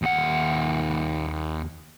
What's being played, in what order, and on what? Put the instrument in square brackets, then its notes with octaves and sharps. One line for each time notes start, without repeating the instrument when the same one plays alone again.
[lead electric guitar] D#2 F#5